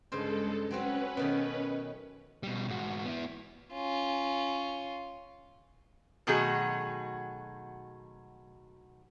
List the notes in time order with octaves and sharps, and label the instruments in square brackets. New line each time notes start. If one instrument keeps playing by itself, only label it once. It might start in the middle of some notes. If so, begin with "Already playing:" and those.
[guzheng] G2 C#3 C5 [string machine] G#3 A4
[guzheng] F#3 C4 F#4 [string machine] C#4 B4
[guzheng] B2 D#3 A3
[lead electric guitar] B2 G3
G#2 F#4
B3 E4
[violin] C#4 F4
[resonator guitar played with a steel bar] B2 D#3 F#3 A3 F#4 G#4